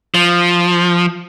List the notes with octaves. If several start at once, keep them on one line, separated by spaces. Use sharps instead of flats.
F3